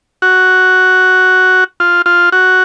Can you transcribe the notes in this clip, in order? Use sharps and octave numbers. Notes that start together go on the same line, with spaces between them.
F#4
F4
F4
F#4